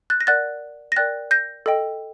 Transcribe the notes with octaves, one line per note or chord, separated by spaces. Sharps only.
F#6 A6
A#6
A#4 D5 F#5 F#6 A6
A#6
A#4 D5 G5 F#6 A6
G6 A#6
A4 D#5 G5